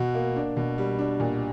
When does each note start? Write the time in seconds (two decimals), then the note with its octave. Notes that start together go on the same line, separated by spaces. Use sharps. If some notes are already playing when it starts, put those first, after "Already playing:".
Already playing: B2 F#4
0.15 A#3
0.36 D4
0.57 B2
0.78 G3
0.99 D4
1.20 A#2